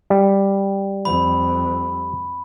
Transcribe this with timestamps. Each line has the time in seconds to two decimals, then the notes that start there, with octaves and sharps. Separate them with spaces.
0.10 G3
1.05 F2 B5